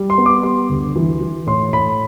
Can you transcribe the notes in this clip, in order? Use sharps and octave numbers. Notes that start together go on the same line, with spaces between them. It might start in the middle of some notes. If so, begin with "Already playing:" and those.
Already playing: G3
C6
B3
D6
G3 C6
D2
E3
E3
A2 C6
A2 B5